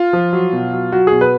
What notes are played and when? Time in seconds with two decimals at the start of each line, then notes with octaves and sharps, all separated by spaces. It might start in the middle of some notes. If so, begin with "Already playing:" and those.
Already playing: F4
0.13 F3
0.33 F#3
0.53 B2
0.73 F#3
0.92 F#3 F#4
1.07 B2 G#4
1.21 B4